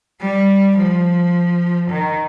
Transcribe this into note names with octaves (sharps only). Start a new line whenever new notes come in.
G3
F3
D#3